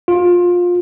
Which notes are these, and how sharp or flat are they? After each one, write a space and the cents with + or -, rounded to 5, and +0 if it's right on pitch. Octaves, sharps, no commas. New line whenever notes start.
F4 +20